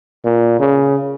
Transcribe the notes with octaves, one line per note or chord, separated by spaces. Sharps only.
A#2
C#3